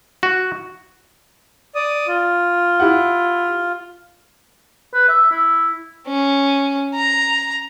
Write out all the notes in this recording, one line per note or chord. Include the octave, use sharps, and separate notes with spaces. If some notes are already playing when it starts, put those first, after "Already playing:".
F#4
D5 D#6
F4
E4 G4 F#5
B4
E5
E4
C#4
A#5